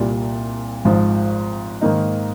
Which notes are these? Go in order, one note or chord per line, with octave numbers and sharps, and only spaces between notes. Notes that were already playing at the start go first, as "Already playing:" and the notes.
Already playing: C2 A#2 G3
G#1 G#2 F3
G#2 D#3 A#3 D#4